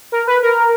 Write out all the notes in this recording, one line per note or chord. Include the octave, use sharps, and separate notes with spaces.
A#4
B4
A#4